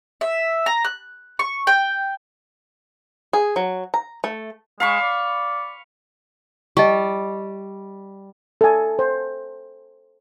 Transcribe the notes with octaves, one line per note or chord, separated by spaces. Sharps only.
E5
A#5
F#6
C#6
G5
G#4
F#3
A#5
A3
G#3 F5 B5 C#6
D5
G3 D#5 A5 C#6
A4 G#5
C5